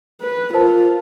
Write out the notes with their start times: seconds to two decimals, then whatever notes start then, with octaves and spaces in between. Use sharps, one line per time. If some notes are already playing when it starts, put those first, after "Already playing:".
0.22 B4
0.53 F4 A#4 C5 A5